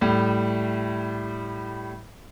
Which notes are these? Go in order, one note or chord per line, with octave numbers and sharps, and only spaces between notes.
A2 G3